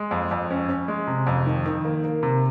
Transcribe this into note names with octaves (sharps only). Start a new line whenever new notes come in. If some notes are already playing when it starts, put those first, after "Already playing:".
Already playing: G#3
F2
F2
C#4
C#4
G#3
C3
F2
D#3
D#3
A#3
A#3
C3